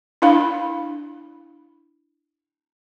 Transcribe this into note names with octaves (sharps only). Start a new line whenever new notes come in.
D4 E4 F5 B5